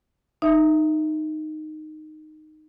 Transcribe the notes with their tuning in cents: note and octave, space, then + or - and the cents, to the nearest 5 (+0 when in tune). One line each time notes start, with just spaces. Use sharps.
D#4 -10 E5 +0